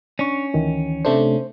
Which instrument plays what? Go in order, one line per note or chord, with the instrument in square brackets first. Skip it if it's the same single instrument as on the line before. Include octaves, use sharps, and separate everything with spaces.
[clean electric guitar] C#4 [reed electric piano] D4 C#6
[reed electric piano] D2 D#3 E3
[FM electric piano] C3 A3 D4 [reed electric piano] C5